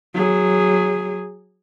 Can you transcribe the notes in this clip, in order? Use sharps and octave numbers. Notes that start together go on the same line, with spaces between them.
F#3 G#4